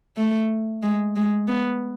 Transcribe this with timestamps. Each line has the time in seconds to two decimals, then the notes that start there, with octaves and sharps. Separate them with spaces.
0.17 A3
0.83 G#3
1.16 G#3
1.48 B3